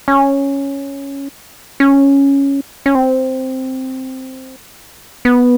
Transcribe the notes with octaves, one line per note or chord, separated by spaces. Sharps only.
C#4
C#4
C#4
C4
B3